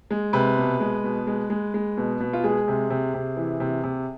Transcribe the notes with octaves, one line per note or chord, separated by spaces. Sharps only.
G#3
C3 B4
B2
G#3
B2
G#3
G#3
G#3
B2
B2
F4
G#3 G#4
C3
C3
C3
E3
C3
C3